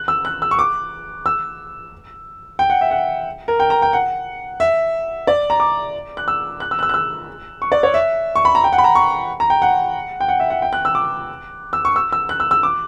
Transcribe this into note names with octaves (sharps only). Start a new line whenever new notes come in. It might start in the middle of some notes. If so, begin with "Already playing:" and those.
Already playing: F#6
E6
F#6
E6
C#6
D6
E6
G5
F#5
E5
F#5
A#4
G5
A#5
G5
F#5
E5
D5
A#5
D6
F#6
E6
F#6
E6
F#6
E6
F#6
E6
C#6
D5
C#5
E5
C#6
B5
A#5
G5
F#5
B5
A#5
C#6
A#5
G5
F#5
G5
F#5
E5
F#5
G5
F#6
E6
D6
E6
C#6
E6
E6
F#6
E6
E6
D6